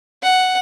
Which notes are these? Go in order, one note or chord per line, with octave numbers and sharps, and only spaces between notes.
F#5